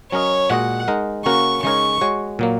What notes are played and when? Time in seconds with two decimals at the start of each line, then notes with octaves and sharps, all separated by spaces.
0.12 F#3 C#4 A#4 C#5 D#5
0.50 A#2 G#3 F#4 D#5 F#5
0.88 G#3 D#4 A#4
1.26 C#3 A#3 C#4 F#4 A#4 C#6
1.63 C#3 G#3 D#4 A#4 C#5 C#6
2.01 G#3 F#4 C#5
2.39 A#2 F#3 A#3